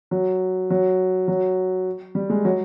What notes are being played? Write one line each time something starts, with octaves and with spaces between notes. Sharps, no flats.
F#3
F#3
F#3
G3
G#3
F#3